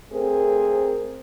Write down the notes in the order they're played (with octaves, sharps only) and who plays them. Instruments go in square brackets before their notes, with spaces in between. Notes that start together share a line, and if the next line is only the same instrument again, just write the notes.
[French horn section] A3 C4 G#4 A#4 C5